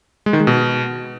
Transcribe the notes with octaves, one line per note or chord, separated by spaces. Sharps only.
G#3
D#3
G#3
B2